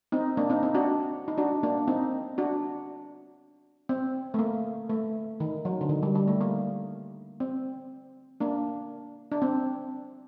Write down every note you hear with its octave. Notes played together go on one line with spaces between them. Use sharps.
C4 D#4
A#3 D4
C4 D#4
C4 D#4
D4 F#4
D#4
D4 F#4
A#3 D4
C4 D#4
D4 F#4
C4
A3
A#3
A3
D#3
F#3
D3
D#3
G3
G3
A3
A#3
C4
A#3 D4
D4
C4